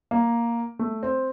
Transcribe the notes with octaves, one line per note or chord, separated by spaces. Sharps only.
A#3
A3
C4